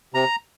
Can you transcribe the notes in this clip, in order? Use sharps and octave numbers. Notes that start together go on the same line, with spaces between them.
C3 A#5